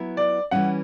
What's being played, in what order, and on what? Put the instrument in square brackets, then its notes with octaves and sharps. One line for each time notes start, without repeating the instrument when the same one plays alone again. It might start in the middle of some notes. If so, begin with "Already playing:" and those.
Already playing: [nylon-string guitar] F#3 B3 E4
[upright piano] D5
[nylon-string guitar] E3 G3 C#4 [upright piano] F#5